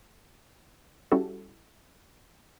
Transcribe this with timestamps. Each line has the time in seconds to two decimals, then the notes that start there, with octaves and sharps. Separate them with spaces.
1.12 G3 C#4 E4 F#4 G4 A4